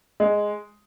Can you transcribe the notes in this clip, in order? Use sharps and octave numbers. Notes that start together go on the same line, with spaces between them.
G#3